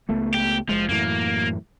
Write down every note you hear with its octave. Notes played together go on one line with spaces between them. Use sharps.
C#2 A3 B3
G4
F#1 F3 G#3
F#2 A2 E3 A#3